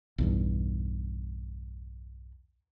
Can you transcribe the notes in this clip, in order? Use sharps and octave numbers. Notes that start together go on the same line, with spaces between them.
B1 E2 G2